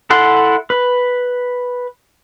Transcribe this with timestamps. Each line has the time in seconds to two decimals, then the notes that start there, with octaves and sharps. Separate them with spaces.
0.10 E4 A4 F#5 C6
0.70 B4